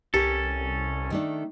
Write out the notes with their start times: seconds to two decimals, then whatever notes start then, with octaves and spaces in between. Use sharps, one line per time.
0.14 C2 C#4 G4 A4 A#4
1.10 D#3 A3 D4